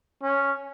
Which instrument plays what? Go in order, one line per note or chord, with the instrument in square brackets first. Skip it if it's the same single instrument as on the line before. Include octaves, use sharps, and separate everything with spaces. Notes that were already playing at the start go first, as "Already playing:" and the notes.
[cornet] C#4